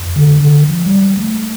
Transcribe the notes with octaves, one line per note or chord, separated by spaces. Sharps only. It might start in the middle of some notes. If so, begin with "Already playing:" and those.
Already playing: F2
D3
D3
F3
G3
A3